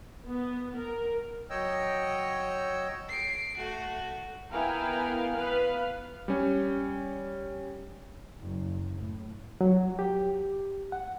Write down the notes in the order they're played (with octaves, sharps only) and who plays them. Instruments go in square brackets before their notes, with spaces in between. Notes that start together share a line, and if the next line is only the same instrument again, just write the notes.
[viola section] B3
A#4
[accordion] F#3 C#5 D#5 G5 E6
[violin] C7 D7
A3 F#4
[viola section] B3 E4 A#4 F5 G5 G#5
B3 B4 F5
[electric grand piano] G3 C#4
[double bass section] F#1
A2
[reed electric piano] F#3
G4
F#5